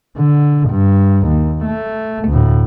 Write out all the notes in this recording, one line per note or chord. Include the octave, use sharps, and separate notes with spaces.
D3
G2
D#2
A3
D2 A2